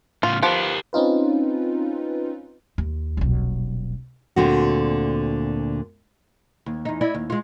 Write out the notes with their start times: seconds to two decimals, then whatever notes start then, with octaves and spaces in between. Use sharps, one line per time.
0.23 A2 C#3 F4
0.43 F3 B3 G4 A#4
0.93 C4 C#4 D#4 F4 B4
2.78 D#2
3.17 D#1 B1
4.36 D2 A#2 D3 C4 F#4
6.66 D#2
6.85 E2 D#4
7.01 E4 D5 D#5
7.15 D#2
7.30 G#3 F4